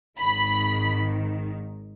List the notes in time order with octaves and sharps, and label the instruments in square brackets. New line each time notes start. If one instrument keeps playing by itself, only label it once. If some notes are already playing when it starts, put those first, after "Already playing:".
[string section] G#1 G#2 D#3 B5